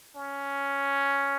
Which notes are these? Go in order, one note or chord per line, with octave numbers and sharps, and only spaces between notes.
C#4